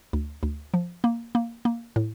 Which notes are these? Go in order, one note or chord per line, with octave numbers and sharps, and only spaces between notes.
D2
D2
F3
A#3
A#3
A#3
A2